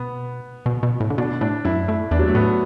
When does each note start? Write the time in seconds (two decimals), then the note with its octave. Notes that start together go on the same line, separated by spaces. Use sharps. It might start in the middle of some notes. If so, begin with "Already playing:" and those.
Already playing: B2 B3
0.66 B2
0.83 B2
1.00 A2
1.10 D3
1.18 B2 D4
1.41 A2 D4
1.65 F#2 E4
1.88 A2 E4
2.11 E2 D4
2.19 F#3
2.27 A3
2.35 A2 B3